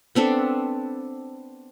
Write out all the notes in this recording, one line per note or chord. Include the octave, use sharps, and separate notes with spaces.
B3 C4 D4 A4